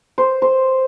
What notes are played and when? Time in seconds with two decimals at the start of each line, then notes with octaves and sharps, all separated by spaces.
0.18 C5
0.42 C5